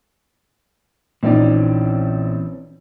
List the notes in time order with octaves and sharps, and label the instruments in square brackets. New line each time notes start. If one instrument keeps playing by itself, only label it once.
[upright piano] A#1 D#4 D5 [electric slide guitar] E3 C4 C#4